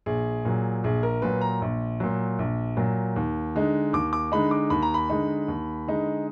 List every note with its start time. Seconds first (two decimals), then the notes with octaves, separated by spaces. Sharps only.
0.06 A#1 G#4
0.45 A#2 F#3
0.84 A#1 G#4
1.03 A#4
1.22 A#2 F#3 B4
1.41 A#5
1.62 A#1
2.00 A#2 F#3
2.39 A#1
2.77 A#2 F#3
3.16 D#2
3.55 D3 G#3 D#4
3.93 D#2 D6
4.13 D6
4.32 D3 G#3 D#4 B5
4.51 D6
4.70 D#2 B5
4.82 A#5
4.94 B5
5.10 D3 G#3 D#4
5.48 D#2
5.87 D3 G#3 D#4